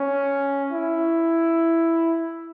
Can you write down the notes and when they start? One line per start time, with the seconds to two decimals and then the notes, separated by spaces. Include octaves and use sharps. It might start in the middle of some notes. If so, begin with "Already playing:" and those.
Already playing: C#4
0.72 E4